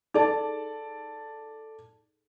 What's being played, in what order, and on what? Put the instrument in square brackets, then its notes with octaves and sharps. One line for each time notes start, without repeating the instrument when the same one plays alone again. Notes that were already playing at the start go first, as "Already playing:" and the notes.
[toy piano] D#4 G#4 [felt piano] A4 D5 A5